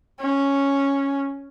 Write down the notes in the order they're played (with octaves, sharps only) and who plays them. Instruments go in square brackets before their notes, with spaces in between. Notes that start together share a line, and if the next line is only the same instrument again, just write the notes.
[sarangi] C#4